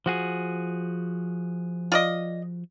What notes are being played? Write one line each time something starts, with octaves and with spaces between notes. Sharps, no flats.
F3 F#4 G#4
F4 D5 D#5